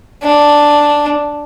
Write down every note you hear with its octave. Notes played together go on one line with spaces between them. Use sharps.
D4